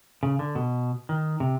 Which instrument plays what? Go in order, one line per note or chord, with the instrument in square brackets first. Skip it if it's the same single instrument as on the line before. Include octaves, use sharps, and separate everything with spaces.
[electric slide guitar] C#3
D3
B2
D#3
C3